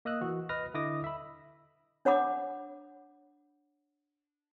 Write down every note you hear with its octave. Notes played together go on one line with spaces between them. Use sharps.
A#3 D#5 D#6 E6 F#6
E3 F#4
B4 D#5 F6 A#6
D3 E4 D#5 D6 D#6 A#6
E5 B5
D4 C#5 F#5 B5 D6